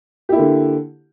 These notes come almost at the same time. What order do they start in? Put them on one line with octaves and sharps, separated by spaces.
G4 E4 A#3 D3